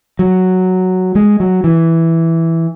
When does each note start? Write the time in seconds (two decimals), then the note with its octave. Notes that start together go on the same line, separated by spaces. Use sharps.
0.19 F#3
1.15 G#3
1.40 F#3
1.64 E3